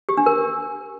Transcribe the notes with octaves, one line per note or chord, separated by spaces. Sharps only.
G4
D4
A#4